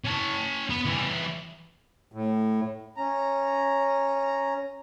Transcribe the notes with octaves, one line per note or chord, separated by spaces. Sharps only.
C#4 A5
B3
E3 G3
A2
C#4 A#5